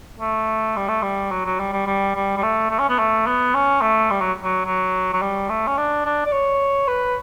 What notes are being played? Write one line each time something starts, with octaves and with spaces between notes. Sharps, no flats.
A3
G3
A3
G3
F#3
F#3
G3
G3
G3
G3
G3
A3
A3
C#4
B3
A3
B3
C#4
A3
G3
F#3
F#3
F#3
F#3
G3
A3
C#4
D4
D4
D5
C#5
B4